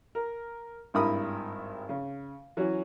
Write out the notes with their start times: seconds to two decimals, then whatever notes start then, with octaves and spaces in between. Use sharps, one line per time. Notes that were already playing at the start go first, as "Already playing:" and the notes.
0.15 A#4
0.94 G#1 G2 E4 A#4 B5 D#6
1.89 C#3
2.57 E3 F#3 C#4 F#4